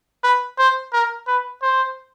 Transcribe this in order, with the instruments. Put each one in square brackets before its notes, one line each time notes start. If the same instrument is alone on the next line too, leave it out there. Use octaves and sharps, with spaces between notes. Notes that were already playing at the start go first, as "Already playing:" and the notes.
[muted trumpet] B4
C5
A#4
B4
C5